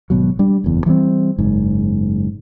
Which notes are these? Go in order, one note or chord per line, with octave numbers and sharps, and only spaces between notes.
G#1 B2 F#3
G3 D4
F#1 E2
E3 G3 G#3 C4
F#1 G#2